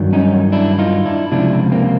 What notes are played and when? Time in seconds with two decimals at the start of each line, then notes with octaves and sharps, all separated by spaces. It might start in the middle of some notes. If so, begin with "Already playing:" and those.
Already playing: G2 D#3 F#3
0.13 C#4 D#4
0.52 D4 E4
0.78 D#4 F4
1.06 D4 E4
1.31 C#2 C3 F3 D4 E4
1.72 A#3 C4